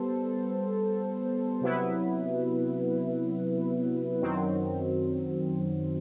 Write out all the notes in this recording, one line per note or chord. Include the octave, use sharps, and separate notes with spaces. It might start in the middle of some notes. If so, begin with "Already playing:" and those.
Already playing: G3 B3 A4 C5
C3 F#3 B3 E4 B4
F#2 D#3 F#3 C4